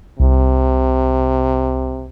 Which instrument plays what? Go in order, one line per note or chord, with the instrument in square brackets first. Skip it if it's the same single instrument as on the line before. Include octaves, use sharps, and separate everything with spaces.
[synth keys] C2 [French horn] C3